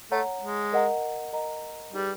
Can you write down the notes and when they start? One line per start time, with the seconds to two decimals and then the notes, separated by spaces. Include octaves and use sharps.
0.11 A3 C#5 F#5 A#5
0.41 G#3
0.73 A#4 D#5 F#5 A#5
1.33 A#4 D#5 F#5 A#5
1.93 G3 D#4 G#4 B4